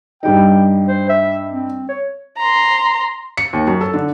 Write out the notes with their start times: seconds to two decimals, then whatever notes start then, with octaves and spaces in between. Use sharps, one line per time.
0.23 G2 G3 D#4 G5
0.88 C5
1.09 E5
1.51 C4
1.89 C#5
2.37 A#5 C6
3.37 C#7
3.53 D#2
3.67 F#2
3.81 A4
3.94 D3